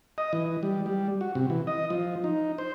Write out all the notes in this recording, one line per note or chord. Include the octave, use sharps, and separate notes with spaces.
D#5
E3
G3
G3
F#4
C3
E3
D#5
F3
D#4
C5